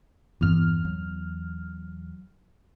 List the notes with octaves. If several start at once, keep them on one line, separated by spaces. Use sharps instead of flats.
E2 G2 C4 F6
F#3